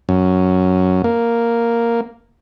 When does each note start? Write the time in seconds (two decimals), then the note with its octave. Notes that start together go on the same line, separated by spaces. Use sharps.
0.09 F#2
1.04 A#3